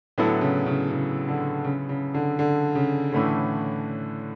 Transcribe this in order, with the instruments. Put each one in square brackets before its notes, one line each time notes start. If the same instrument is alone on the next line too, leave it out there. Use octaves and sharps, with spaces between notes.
[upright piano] A2 [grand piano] D3 F#3 B3 E4 A4
[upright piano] C#3
C#3
C#3
D3
C#3
C#3
D3
D3
C#3
[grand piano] A2 E3 A3 C#4 [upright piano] D3